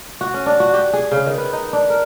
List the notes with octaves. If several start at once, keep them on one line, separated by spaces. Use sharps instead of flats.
F#4
C#4
D4
F#4
G4
G#4
C#3
D#3
B4
D#4
D4
A#4